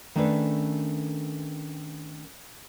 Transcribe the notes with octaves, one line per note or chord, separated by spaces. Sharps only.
D#3 A3 C#4 D4 A4 B4